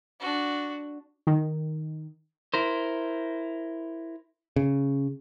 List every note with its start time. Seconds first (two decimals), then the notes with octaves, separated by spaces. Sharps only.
0.20 D4 F#4
1.27 D#3
2.54 E4 A#4 C5
4.56 C#3